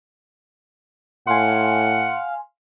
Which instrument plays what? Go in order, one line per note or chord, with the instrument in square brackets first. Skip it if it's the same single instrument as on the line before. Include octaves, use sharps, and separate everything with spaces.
[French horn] A2 [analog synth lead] F5 [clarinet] F#5 [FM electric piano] G#5 C6